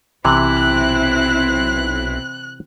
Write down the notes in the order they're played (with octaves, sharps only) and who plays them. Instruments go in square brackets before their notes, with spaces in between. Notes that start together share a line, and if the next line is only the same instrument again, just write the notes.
[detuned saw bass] B1 [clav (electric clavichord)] C3 E3 [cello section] C4 E4 [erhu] F#6